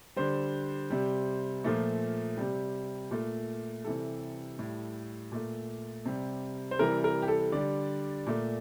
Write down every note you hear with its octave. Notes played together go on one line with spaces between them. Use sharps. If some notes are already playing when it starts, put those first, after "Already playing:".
D3 G3 C5
C3 G3
A#2 F3 A3
C3 G3
A#2 A3
C3 E3 G3 A4
A2 G3
A#2 A3
C3 G3
C5
C3 E3 G3 A#4
A#4
G4
A4
D3 G3 D5
A#2 A3